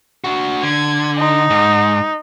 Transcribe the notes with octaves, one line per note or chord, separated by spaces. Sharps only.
D4 F#4
D3 G#6
D#4
G#2